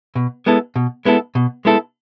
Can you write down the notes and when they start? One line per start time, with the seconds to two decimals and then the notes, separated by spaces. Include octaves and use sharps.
0.15 B2
0.46 G#3 B3 E4 A4
0.76 B2
1.05 G#3 B3 E4 A4
1.35 B2
1.65 G#3 B3 E4 A4